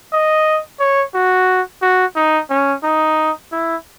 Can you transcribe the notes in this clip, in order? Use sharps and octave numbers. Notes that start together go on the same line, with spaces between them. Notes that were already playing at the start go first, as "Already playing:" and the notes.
D#5
C#5
F#4
F#4
D#4
C#4
D#4
E4